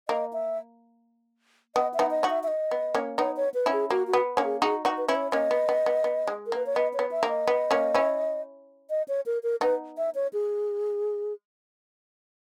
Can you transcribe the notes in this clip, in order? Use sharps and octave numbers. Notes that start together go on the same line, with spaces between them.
A#3 D#5
E5
B3 D#5
E5
B3 D#4
D#5
D#4 F#4
E5
E5
D#5
B3
A#3 C#4
B3 D#4 C#5
C#5
B4
C#4 E4
G#4
A#3 F#4
F#4
B3
A#3 C#4
G#4
D#4 F#4 G#4
D#4 F#4
B4
C#4 E4 B4
C#5
A#3 C#4 D#5
B3
B3
B3
B3
G#3
A#4
A#3 B4
C#5
B3 D#5
C#5
B3
E5
A#3
D#5
B3
A#3 C#4
C#4 E4
D#5
C#5
A#4
A#4
B3 D#4 B4
E5
C#5
G#4